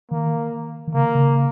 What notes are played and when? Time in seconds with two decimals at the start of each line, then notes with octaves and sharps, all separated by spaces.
0.11 D#3 A#3
0.87 D#3
0.94 C#3 A#3
1.15 C#3